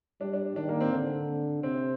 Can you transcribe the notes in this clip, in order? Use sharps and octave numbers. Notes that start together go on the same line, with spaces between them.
G3 D4
D4
D#3 D4
A#3
C4
D3
C3 C4